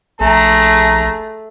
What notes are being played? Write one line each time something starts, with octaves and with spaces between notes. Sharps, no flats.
A#1 A3 G#4 A#5